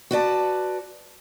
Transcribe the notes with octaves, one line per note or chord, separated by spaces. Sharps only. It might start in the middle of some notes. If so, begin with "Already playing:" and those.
F#4 B4 D5 A5